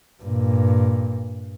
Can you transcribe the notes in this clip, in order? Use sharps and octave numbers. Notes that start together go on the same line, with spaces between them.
G2 A#2